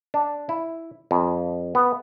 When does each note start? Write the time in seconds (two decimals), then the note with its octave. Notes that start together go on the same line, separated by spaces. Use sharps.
0.14 D4
0.49 E4
1.11 F2
1.75 B3